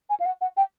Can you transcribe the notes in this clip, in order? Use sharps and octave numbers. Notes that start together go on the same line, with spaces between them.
G#5
F5
F#5
F#5
G5